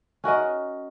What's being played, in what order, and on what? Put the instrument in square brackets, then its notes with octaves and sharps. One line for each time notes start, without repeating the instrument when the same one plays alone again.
[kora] C#4 F#4 A#4 D#5